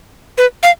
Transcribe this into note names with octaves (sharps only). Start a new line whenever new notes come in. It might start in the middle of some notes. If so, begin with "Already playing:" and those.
B4
F5